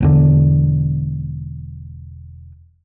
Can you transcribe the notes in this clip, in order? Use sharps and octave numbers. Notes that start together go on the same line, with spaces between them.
E1 E2 D3